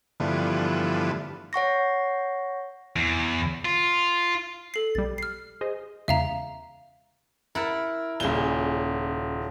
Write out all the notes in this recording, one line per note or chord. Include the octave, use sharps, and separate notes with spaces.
G2 D3 E3 F3 A3 B3
C#5 F#5 C#6 A#6
E2
F4
A4 C7
B1 G3 A6
F6 C7
G#4 C5 D#5
E2 C#3 G#3 E5 F5 A#5
E4 A#4 F#5 A5
D#1 A#2 C#3 G7